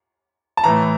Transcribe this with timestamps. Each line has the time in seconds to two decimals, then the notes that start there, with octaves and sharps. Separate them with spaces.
0.57 A5
0.64 A2 E3 A3 A#5